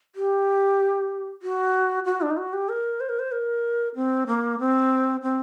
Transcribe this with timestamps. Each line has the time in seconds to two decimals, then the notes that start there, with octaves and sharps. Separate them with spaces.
0.16 G4
1.42 F#4
2.05 F#4
2.22 D4
2.30 D#4
2.37 F#4
2.53 G4
2.69 A#4
3.00 C5
3.09 A#4
3.19 C5
3.32 A#4
3.96 C4
4.27 A#3
4.60 C4
5.22 C4